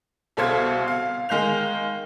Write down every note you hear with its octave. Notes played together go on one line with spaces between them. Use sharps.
C2 B2 A4 C5 F5 G#6
F5
D#3 G#3 F5 G6 F7